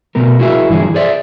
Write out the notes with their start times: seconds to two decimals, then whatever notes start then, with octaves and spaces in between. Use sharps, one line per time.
0.15 B2 A3 B3 A#4
0.39 E4 F#4 G#4 A#4 E5
0.69 G2 E3 F#3 G#4
0.94 G#4 C5 D5 E5